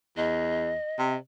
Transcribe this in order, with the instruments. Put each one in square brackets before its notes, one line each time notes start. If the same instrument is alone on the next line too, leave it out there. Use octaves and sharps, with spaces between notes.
[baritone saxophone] E2 [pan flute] D#5
[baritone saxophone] C3